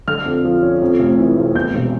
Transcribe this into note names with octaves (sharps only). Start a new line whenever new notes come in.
D3 F6
F2
F3
C#4
F2
F1
E3
F1
E2 G6
E1